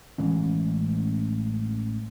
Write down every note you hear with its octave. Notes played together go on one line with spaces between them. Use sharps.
A1 E3 G#3 C#4